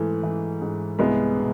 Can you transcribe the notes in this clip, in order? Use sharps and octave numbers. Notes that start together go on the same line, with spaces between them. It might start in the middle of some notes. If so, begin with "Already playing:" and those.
Already playing: G#2 E3 A3
E3
G#2
C2 G#3 B3
B2